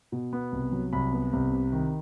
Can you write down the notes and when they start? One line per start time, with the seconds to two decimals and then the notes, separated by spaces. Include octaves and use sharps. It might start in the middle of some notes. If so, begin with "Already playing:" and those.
0.12 B2
0.33 B3
0.52 C2
0.72 F#3
0.93 C2 B5
1.12 B3
1.33 C2
1.52 C3
1.73 D#3